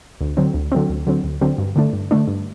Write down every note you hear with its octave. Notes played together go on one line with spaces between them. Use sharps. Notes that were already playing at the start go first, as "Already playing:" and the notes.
D2
D3 F#3 C4
D2
D3 F#3 C4
D2
D3 F#3 C4
D2
D3 F#3 C4
G2
D3 A3 D4
G2
D3 A3 D4
G2